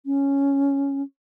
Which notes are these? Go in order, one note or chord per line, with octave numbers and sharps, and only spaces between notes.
C#4